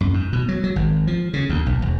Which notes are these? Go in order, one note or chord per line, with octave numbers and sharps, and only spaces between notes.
F#2
G#2
B2
F#3
F#3
G#1
F3
C#3
D2
B1
E1